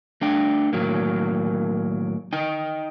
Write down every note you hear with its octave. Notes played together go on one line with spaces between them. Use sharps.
A3 D4 G5
A2 D#3 F#3 A#3
D#4 D#5 G5